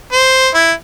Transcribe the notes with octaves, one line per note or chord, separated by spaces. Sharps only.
C5
E4